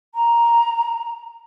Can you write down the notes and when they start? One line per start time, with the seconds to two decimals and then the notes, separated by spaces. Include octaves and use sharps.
0.15 A#5